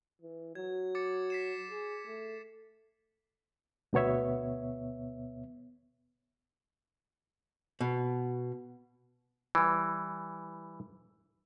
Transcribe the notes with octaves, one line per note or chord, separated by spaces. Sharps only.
E3
F#3 G#6
D6 A6 C#7
B6 C7 E7
G#4
A3
D2 B2 B3 C#5 E5
B2
E3 G3